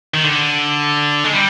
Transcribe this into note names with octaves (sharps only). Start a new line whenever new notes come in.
D#3
D3
G#3
G3